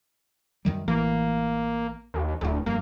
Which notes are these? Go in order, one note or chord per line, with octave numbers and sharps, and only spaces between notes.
F#2 D#3 G3
A1 A2 E3 A#3
D#2
D1 D2 A2
F1 G2 A#3